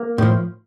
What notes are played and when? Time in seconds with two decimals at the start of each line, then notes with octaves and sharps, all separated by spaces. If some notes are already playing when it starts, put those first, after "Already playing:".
Already playing: A#3
0.18 A2 F3